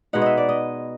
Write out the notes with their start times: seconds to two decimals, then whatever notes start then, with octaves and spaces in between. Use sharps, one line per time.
0.13 B2 G#3 B3 D#4 F#5
0.22 D#5 E5
0.37 D5
0.49 D#5